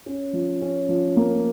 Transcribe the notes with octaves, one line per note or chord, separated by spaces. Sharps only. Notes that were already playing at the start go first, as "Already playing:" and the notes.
C#4
F3
C#4
F3
A#3